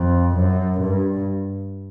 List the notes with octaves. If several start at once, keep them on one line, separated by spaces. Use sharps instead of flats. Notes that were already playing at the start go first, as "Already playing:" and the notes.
Already playing: F2
F#2
G2